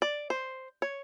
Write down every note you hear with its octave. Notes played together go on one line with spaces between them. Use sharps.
D5
C5
C#5